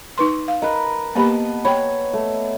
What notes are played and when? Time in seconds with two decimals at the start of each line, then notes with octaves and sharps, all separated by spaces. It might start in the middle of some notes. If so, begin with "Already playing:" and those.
0.18 D#4 B4 C6
0.48 F5
0.62 A#4 B4 D#5
1.15 A#3 B3 G4 D#5 A5 B5
1.65 C#5 G5 B5
2.13 A3